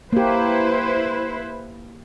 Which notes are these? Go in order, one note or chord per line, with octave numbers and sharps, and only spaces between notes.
A#3 E4 G4 B4 C5